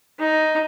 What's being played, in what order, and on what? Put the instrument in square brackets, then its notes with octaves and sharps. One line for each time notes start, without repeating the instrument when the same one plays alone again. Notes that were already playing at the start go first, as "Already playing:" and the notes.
[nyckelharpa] D#4